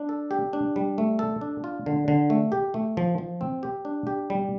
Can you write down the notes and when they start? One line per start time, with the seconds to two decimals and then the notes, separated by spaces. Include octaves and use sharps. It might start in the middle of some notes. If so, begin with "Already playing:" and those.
Already playing: D4
0.09 A4
0.31 G4
0.53 D4
0.76 G3
0.98 A3
1.19 A4
1.41 D4
1.64 F4
1.86 D3
2.08 D3
2.30 A3
2.52 G4
2.74 A3
2.97 F3
3.18 F3
3.41 C4
3.63 G4
3.85 D4
4.07 G4
4.30 G3